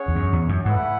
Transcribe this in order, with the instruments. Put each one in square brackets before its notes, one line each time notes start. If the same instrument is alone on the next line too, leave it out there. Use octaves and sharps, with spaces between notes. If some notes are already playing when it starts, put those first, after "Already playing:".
Already playing: [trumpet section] C#4 G#4 C#5 F#5
[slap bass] E2
F#2
E2
F#2
[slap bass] G#2 [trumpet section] A3 E4 B4 F#5